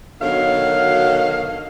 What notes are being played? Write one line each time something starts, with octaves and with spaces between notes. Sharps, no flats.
B2 D3 D#3 F#3 F5 F#5